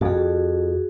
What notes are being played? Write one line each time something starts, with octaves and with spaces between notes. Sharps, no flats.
F2 F#4 G#4